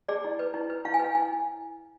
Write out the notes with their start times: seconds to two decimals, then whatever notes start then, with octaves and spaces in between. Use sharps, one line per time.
0.08 G#4 D5
0.24 E4
0.39 B4
0.54 E4
0.70 B4
0.85 E4 F5
0.94 G#5
0.99 B4 F5
1.15 E4 G#5